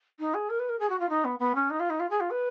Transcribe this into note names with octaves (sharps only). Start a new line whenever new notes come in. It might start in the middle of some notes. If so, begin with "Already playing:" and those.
D#4
G#4
A#4
B4
A#4
G#4
F#4
F4
D#4
B3
B3
C#4
D#4
F4
D#4
F4
G#4
F4
B4